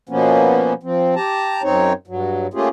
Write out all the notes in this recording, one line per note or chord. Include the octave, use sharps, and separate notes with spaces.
B2 F3 A#3 B3 C#4
F3 C4
G4 A5 A#5
F#2 C4 D#4 C#5
G2 F#3
A3 A#3 C#4 F4 G4 G#4